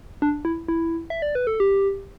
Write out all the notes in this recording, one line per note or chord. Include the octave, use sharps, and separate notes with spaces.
D4
E4
E4
E5
D5
B4
A4
G4